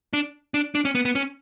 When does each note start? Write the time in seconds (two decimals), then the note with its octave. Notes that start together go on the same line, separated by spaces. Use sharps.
0.13 D4
0.54 D4
0.75 D4
0.85 C#4
0.95 B3
1.05 B3
1.15 C#4